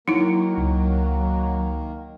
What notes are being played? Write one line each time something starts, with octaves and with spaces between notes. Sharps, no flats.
D#3 F#3 A#3 D#4 E4
C#2